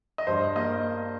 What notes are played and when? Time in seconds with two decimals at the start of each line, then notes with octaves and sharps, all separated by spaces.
0.18 D#5
0.27 G2 C5
0.56 A#3 D#5